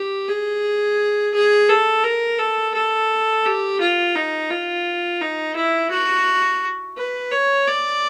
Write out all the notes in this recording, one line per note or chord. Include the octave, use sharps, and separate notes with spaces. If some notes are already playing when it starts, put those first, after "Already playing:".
Already playing: G4
G#4
G#4
A4
A#4
A4
A4
G4
F4
D#4
F4
D#4
E4
F#4
B4
C#5
D5